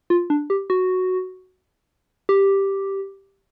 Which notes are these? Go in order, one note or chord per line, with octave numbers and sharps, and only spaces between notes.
F4
D4
G4
F#4
G4